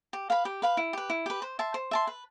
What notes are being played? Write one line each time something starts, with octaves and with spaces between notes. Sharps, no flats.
G4
B4 F5 B5
G4
B4 F5 B5
E4
G4 B4
E4
G4 B4
C5
E5 A5 C6
C5
E5 A5 C6
B4